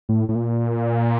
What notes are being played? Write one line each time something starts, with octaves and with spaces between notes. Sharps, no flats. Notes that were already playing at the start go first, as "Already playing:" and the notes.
A2
A2
A#2